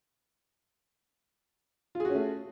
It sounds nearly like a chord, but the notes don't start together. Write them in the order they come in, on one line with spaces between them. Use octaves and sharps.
F4 G#4 F#4 C#4 A3